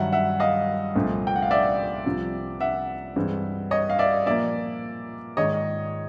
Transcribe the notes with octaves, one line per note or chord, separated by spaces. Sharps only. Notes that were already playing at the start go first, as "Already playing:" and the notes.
Already playing: G2 D#3 F#3 E5 F#5
E5 F#5
D#5 F5
C2 A#2 F3 A3 C4
G5
F#5
F5
D5 E5
C2 C3 F3
E5 F#5
G2 E3 G#3 C4
C#5 D#5
F5
D5 E5
A#2 F3 A#3 D5 E5
G#2 D#3 G#3 C#5 D#5